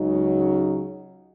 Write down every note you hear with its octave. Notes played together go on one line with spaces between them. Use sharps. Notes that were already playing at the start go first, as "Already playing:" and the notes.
Already playing: C#2 C#3 F#3 D#4